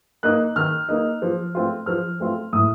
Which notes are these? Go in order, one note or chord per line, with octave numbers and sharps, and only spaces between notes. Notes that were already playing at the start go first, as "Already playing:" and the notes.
A#3 D#4 F#6
D#3 F6
A#3 D#4
F3
A3 C4 F4
F3 F6
A3 C4 F4
A2 D#6